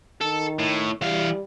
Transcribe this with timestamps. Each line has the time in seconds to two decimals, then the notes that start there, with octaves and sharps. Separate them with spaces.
0.21 D#3 A4
0.59 A2
1.02 E3 G3 F5